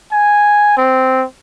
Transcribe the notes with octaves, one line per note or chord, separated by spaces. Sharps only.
G#5
C4